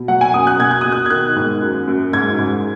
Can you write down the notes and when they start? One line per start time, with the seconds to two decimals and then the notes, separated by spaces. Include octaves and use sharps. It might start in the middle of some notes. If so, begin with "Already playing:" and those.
Already playing: B2
0.08 F#3 F#5
0.21 G#5
0.34 F#2 D#6
0.47 F#6
0.60 B2 G#6
0.71 F#6
0.81 B2 D#6
0.92 F#6
1.06 G#6
1.10 D#3 F#6
1.36 G#2
1.62 F#2
1.88 F#2
2.13 G#2 G#6
2.39 G#2